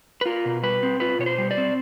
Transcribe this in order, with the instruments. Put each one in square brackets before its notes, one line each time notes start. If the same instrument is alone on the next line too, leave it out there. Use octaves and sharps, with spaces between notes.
[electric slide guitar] B4
F4 A#4
B2
G3 B4
C4
F4 B4
B2 C#5
C5
G3
D5
C4